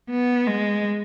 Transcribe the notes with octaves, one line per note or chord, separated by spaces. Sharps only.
B3
G#3